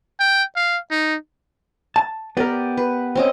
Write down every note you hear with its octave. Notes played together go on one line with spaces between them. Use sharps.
G5
F5
D#4
A5
B3 G4 A#4 D5
B4
C4 C#4 D#5